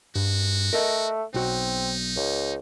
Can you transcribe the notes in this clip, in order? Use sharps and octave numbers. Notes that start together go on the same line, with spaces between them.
G2 F#4
A3 A#4 D#5
B1 C4 D#4 F#4
C#2